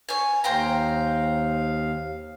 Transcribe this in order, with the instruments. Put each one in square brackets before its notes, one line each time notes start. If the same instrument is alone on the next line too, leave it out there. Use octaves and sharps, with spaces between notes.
[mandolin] C#5 G#5
[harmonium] D#2 F5 [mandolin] C5 G5 A#5